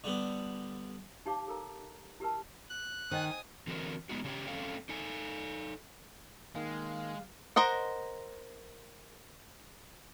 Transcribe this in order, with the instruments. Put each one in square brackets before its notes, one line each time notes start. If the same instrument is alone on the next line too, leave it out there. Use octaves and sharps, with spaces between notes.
[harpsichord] D3 G3 B3
[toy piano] D#4 G4 C#5 F5 A5 D6
A4 A#4 A#5
E4 G4 A#4 B4 A5
[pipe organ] F#6
[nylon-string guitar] D#3 [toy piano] C5 D#5 G5 [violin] G#5 D#6
[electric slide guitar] D3 E3 C4 F#4 A4 A#4
G#3 B3 D#4 F#4
C#3 C#4 G4 C#5 G5
A3 C4 C#4 A4 F5 G5
D#4 A4 G#5
[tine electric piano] D#3 A#3 [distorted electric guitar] G#3 [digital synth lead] F5
[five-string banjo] A#4 C5 D#5 F#5